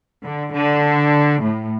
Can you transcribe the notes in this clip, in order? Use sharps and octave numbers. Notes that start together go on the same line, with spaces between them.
D3
D3
A2